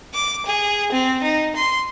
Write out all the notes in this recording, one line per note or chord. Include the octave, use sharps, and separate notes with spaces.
D6
G#4
C4
D#4
C6